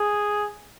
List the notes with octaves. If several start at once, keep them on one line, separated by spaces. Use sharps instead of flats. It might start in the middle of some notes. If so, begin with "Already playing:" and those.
Already playing: G#4